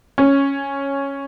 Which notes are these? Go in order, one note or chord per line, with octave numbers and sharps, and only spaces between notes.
C#4